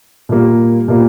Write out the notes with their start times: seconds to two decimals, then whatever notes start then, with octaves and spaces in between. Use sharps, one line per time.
0.29 A#2 G3 A#3
0.88 A#2 G3 A#3